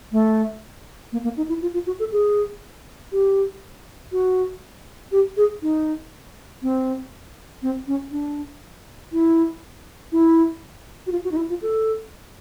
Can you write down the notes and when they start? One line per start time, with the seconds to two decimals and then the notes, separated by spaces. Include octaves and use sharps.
0.12 A3
1.12 A#3
1.24 A#3
1.37 D#4
1.49 E4
1.62 F4
1.74 F4
1.86 F#4
1.99 A4
2.12 G#4
3.12 G4
4.12 F#4
5.12 G4
5.37 G#4
5.62 D#4
6.63 C4
7.62 C4
7.87 C#4
8.11 D4
9.12 E4
10.12 E4
11.07 F#4
11.12 F4
11.24 F#4
11.32 D#4
11.37 E4
11.50 F4
11.62 A4